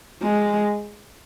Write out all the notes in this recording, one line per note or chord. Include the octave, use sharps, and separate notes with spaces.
G#3